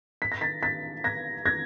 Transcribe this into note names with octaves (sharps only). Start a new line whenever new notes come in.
B6
A#6
A6 B6
A6 B6
G#6 A#6
G#6 A#6